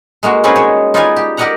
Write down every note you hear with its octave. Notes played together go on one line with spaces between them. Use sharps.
G#3 A#3 F#4
C4 C#4 D#4 G#4 B4 D5
G#3 C#5
D#4 F4 B4 D5 F5 G#5
G4
G4 A#4 D5 D#5 F#5 A#5